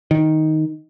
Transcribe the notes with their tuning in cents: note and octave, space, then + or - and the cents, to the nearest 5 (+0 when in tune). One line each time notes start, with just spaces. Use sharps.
D#3 +5